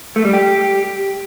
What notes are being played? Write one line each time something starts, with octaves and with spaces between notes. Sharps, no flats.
A3
G3
G4